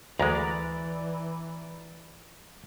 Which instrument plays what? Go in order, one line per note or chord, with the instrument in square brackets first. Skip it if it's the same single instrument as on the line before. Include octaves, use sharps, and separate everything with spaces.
[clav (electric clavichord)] D2 G#3 [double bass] E3 [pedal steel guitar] D5 A#5 B5